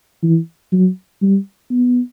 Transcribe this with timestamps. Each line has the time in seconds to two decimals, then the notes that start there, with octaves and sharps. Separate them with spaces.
0.23 E3
0.72 F#3
1.22 G3
1.70 B3